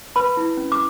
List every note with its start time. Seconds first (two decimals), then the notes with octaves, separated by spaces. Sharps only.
0.16 B4 B5
0.37 E4
0.57 C#4
0.72 D6